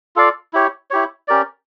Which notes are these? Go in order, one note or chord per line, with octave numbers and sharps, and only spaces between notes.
F4 A4 D5 F5
E4 G4 C#5
E4 G4 C#5
C#4 G4 A#4 D5